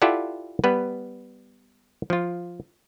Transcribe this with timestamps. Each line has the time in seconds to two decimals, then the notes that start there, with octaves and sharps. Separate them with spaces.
0.02 E4 F4 G4 A4 D5 F#5
0.64 G3 B3 B4
2.10 F3 F4